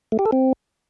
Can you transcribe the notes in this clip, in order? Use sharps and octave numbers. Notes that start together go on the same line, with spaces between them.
A3
G4
A4
C4